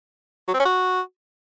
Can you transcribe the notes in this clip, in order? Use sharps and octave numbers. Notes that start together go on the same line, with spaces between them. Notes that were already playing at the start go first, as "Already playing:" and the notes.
F#3
C4
C#4
F#4